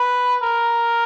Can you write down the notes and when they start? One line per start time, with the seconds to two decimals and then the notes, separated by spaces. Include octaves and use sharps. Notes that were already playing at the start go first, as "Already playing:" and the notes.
Already playing: B4
0.43 A#4